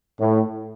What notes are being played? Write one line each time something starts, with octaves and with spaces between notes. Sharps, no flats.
A2